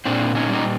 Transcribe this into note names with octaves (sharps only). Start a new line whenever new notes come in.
A#2 C4 D4
C#4 D#4
G3 D#4